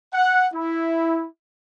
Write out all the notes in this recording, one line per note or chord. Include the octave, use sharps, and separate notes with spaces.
F#5
E4